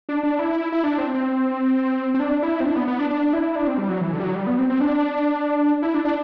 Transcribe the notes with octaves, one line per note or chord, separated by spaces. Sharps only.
D4
D4
E4
E4
D4
C4
C4
C4
D4
E4
C4
D4
B3
B3
D4
D4
E4
D4
C4
G3
F#3
E3
D3
G3
F#3
G3
B3
C4
C4
D4
E4
D4
D4